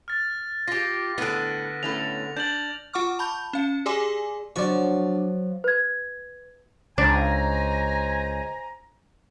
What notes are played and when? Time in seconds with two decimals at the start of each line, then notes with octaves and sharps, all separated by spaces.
0.08 F6 A6
0.68 F4 G4 A#6
1.18 A2 D3 B3
1.83 A2 A3 C#4 F7
2.37 D4 G6 A6 F#7
2.93 F4 F#5 C#6 D6 F6
3.19 A5 B5 G6
3.53 C#4 F5
3.86 G4 G#4 D5 G#5 C6 D6
4.56 F3 F#3 D4 F4 F#4 D5 C#6
5.64 B4 G#6
6.98 C#2 D4 C5 G#5 A#5